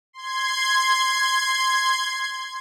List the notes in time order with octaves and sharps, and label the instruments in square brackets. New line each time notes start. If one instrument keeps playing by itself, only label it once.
[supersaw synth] C6 G#6